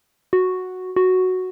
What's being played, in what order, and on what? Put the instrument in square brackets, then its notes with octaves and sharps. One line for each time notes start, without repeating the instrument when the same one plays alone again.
[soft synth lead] F#4
F#4